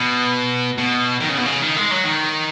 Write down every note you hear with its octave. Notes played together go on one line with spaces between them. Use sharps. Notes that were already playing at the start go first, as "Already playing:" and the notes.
Already playing: B2
B2
D#3
C#3
B2
C#3
D#3
G#3
F#3
D#3